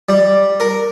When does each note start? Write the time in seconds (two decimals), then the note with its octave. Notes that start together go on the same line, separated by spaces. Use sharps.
0.09 G3
0.60 A#4